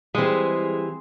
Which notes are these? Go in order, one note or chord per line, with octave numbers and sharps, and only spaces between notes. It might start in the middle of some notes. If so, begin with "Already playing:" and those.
E3 G3 G#3 C4 G#4